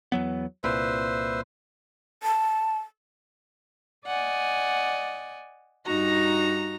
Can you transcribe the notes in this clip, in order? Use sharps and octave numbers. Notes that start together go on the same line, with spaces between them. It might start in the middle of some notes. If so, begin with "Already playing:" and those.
E2 F#3 B3
C2 A#2 B4 C5 E5
A5
D5 D#5 F#5 G#5
G2 D#4 F#4 A#5 A#6